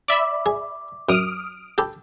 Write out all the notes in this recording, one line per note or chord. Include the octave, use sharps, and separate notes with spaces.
D5 E5 B5 D6
G#4
F#2 D#6 F6 D7
G4 A4 B5